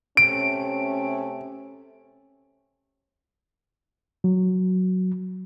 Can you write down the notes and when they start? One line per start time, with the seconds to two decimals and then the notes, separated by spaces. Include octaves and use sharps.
0.17 C3 A3 C#4 D7
4.24 F#3